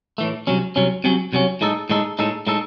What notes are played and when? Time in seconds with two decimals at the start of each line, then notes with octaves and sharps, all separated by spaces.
0.18 A2 E3 A3
0.47 C2 C3 F#3 C#4
0.76 C2 C3 F#3 C#4
1.04 C2 C3 F#3 C#4
1.33 C2 C3 F#3 C#4
1.61 A2 G#3 D#4 A4
1.90 A2 G#3 D#4 A4
2.19 A2 G#3 D#4 A4
2.47 A2 G#3 D#4 A4